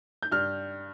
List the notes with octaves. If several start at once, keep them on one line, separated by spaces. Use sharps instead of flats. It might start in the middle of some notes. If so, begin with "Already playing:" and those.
G6
G2 F6